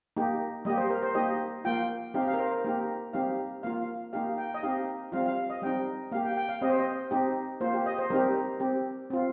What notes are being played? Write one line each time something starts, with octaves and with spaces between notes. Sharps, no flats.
A#3 D#4 G4
G3 A#3 G4 D#5
C5
A#4
C5
A#3 D#4 G4 D#5
A#3 F4 G5
C4 D#4 G4 F5
F5
A#4
C5
A#4
A#3 D#4 G4 A#4
G3 C4 D#4 G4 F5
A#3 F4 F5
A#3 D#4 G4 F5
G5
D#5
C4 D#4 G4 F5
G3 C4 F4 F5
F5
D#5
G3 C4 D#4 G5
A#3 G4 F5
G5
G5
F5
C4 G4 D#5
C5
D#5
C4 D#4 G4
A#3 F4 C5
G4
D#5
C5
G3 C4 D#4 G4 A#4
C4 G4
C4 F4